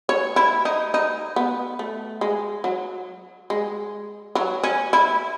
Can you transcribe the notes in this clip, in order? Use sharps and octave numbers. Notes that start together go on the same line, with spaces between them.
C#5
E4
D#4
D#4
B3
A3
G#3
F#3
G#3
F#3
C#4
E4